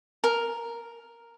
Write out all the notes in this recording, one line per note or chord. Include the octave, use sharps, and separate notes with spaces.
A#4